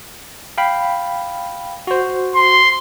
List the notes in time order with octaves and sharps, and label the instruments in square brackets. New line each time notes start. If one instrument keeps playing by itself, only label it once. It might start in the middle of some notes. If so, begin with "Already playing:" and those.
[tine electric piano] F5 G5 B5
F#4 C5
[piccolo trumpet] C6